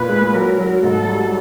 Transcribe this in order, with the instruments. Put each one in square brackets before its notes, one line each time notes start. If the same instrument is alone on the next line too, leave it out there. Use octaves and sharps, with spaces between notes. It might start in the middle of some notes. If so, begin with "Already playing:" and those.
Already playing: [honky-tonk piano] A#2 [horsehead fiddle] B4
[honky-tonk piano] G#3
[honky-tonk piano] F#3 [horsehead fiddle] A#4
[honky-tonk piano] F#3
[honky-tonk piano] G#2 [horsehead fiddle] A4
[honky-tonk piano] G3